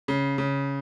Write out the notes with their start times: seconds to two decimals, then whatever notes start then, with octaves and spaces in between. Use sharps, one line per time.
0.08 C#3
0.38 C#3